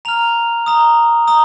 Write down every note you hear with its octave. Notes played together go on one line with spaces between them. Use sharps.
A#5 F6 F7
A#5 D#6
A#5 D#6